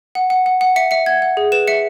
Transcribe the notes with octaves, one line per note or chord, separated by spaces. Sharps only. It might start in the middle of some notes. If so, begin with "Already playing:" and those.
F#5
F#5
F#5
F#5
E5 C#7
E5 C#7
F#5 G#6
F#5
G#4
B4 E7
E5 C#7